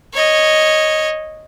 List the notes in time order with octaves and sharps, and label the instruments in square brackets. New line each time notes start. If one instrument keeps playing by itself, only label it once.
[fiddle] C#5 D#5